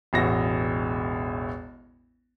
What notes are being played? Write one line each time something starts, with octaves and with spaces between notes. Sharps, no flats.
E1 A1 F#4 A#6